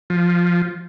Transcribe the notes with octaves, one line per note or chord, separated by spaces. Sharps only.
F3